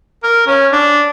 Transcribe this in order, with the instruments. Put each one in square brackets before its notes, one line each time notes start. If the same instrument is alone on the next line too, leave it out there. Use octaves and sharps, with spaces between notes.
[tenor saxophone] A#4
C#4
D4